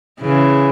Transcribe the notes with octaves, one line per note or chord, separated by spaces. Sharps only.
C#3 E3